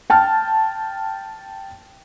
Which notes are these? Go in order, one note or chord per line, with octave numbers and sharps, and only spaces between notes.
G5 A5 F6